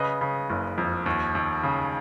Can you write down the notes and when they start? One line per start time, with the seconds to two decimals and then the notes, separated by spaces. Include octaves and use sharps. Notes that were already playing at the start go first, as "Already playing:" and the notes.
Already playing: C#3 B4 D#5
0.21 C#3
0.50 F#1
0.78 F2
1.06 D#2
1.35 D#2
1.63 C#3